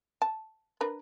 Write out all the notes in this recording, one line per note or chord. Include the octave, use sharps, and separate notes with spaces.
A5
D4 A#4 B4